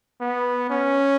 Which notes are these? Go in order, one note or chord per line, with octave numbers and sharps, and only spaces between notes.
B3
C#4